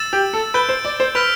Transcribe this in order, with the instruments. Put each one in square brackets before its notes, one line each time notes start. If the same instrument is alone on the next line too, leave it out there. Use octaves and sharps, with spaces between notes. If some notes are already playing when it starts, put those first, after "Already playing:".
Already playing: [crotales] E6 A6 E7
[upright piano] G4
A4
[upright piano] B4 [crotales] G6 D7 G7
[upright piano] C5
D5
C5
[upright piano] B4 [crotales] F6 B6 D7 F7